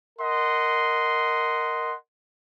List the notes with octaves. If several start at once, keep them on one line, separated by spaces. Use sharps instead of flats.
A#4 D#5 F#5 C6